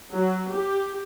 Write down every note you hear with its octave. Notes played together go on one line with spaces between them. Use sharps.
F#3
G4